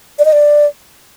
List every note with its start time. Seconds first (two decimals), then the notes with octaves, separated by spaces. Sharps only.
0.19 D5
0.25 D#5
0.32 D5